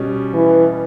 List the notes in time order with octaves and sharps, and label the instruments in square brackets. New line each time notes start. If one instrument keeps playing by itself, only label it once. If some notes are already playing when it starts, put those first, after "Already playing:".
Already playing: [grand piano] B2 G3 C#4
[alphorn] E3